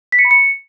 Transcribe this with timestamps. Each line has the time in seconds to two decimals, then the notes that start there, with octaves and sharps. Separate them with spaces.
0.12 B6
0.19 C#7
0.25 B5
0.31 C#7